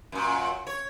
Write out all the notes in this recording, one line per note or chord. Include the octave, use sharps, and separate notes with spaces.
F#2 A#2
C#5